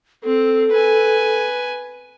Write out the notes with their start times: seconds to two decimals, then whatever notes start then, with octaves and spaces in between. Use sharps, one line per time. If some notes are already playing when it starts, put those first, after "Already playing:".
0.24 C4 A4
0.72 B4 G#5